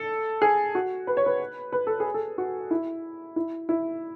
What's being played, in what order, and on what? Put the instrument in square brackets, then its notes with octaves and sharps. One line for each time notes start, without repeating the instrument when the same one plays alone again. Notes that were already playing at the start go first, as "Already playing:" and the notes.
Already playing: [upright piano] A4
G#4
F#4
B4
C#5
B4
B4
A4
G#4
A4
F#4
E4
E4
E4